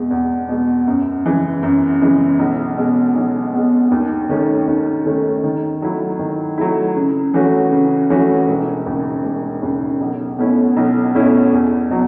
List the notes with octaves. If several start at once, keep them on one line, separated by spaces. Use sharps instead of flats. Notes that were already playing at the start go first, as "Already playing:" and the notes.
Already playing: E2 B2 G#3
E2
B2 G#3
F#2
C#3 E3 G#3
F#2
C#3 E3 G#3
B1
B2 G#3
B1
B2 G#3
D#2
D#3 A3 C#4
D#2
D#3 A3 C#4
D#3
F#3 A3 E4
D#3
F#3 A3 E4
C#3
E3 A3 C#4 F#4
C#3
E3 A3 C#4 F#4
E1
D#2 C#3
E1
D#2 C#3
B1
B2 A3 C#4 E4
B1
B2 A3 C#4 E4
E2
B2 F#3